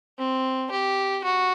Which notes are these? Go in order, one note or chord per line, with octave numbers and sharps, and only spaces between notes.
C4
G4
F#4